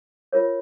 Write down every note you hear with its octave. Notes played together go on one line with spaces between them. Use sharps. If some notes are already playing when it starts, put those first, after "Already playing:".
F4 A#4 C#5